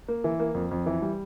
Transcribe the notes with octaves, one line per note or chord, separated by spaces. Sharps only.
A#3
E3
A#3
F2
F2
E3
G3